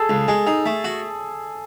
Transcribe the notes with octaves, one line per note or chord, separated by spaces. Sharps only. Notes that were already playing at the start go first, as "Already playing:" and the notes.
Already playing: G#4 A4
C#2
G#3 G#4
D#4 G#4
A3
F#4